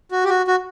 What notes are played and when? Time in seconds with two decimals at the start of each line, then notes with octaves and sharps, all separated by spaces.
0.11 F#4
0.24 G4
0.30 F#4
0.47 F#4